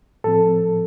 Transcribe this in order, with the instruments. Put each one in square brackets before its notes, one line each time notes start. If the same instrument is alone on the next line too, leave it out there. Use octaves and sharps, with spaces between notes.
[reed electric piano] A2 F3 C4 A4